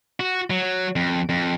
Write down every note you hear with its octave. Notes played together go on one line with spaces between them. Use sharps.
F#4
F#3
F2
F2